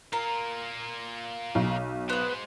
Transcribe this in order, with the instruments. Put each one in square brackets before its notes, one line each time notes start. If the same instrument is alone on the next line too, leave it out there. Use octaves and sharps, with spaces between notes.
[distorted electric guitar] A#3 F4 [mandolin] A#4
[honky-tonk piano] B1
[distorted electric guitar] G#3 C5 [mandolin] B3 B4